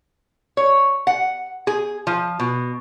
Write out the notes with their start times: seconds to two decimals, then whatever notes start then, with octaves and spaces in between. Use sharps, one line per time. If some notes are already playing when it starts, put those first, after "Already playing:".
0.57 C#5
1.07 F#5
1.67 G#4
2.07 F3
2.40 B2